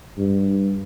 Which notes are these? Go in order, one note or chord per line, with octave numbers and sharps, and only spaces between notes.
G2